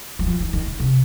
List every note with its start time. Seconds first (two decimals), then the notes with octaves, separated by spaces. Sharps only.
0.19 F#3
0.26 F3
0.40 D#3
0.53 D#3
0.66 D#3
0.80 C3